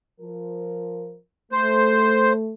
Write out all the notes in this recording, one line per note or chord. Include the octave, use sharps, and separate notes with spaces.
F3 A#4
A3 C5